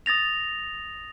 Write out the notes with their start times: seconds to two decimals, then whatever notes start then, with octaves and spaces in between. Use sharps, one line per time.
0.06 D#6 A6 A#6 F7